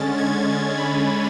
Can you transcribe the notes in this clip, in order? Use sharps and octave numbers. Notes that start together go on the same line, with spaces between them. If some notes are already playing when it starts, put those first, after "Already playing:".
Already playing: D3 G#3 C#4 A6
G#6
B5